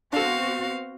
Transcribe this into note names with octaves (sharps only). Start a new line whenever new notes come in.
B3 C4 D4 F#4 A4 F5